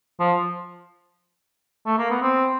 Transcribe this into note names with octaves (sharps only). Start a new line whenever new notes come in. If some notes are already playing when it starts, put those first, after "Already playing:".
F3
A3
A#3
B3
C4